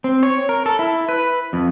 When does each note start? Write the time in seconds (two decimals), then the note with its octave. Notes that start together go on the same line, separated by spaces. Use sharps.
0.04 C4
0.23 C#5
0.49 A#4
0.66 A4
0.79 E4
1.09 B4
1.53 F2